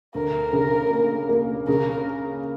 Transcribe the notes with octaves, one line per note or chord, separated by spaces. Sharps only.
D2 A#4
C#3
A#3
A#3
C#3 A#4